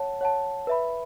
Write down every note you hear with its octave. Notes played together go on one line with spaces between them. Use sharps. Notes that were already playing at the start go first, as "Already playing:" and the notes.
Already playing: C#5 F#5 A5
C#5 F#5 A5
B4 E5 B5